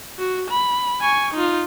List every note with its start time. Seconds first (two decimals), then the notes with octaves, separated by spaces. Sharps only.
0.19 F#4
0.51 B5
1.02 G#5 C#6
1.34 D#4 F4